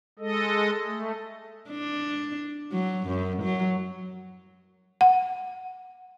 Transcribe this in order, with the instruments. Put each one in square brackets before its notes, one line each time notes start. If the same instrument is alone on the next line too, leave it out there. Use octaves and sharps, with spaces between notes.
[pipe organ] G#3 A4 D#5
A3
[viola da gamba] D4
F#3
F#2
F#3
[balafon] F#5